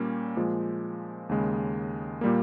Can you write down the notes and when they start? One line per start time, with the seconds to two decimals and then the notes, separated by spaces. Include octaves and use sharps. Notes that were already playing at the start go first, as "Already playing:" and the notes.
Already playing: A#2 G3 A#3 C#4
0.37 A#2 F3 G#3
1.29 D#2 C#3 G#3
2.21 A#2 G3 A#3